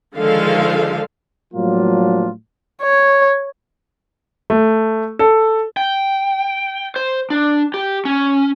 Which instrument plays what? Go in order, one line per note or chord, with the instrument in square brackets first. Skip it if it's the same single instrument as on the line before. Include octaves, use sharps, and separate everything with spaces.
[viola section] D3 D#3 F3 G#3 A4 F5
[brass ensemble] A2 F3 F#3 A#3 D4 F4
[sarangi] C#5
[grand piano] A3
A4
[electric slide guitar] G5
C5
D4
G4
C#4